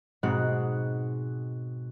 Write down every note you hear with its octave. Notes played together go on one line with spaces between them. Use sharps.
G#2 B2 G#3 C4 F#4 F#6